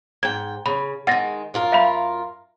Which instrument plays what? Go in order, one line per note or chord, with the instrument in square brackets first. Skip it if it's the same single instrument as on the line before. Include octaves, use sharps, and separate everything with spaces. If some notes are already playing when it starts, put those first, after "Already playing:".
[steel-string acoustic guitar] G#2 G5 [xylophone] G#6
[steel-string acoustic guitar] C#3 [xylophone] B5
[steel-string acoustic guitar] D#3 G#3 [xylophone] F#5 A6 A#6
[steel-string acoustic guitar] F#2 F4 A#4
[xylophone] E5 F5 B5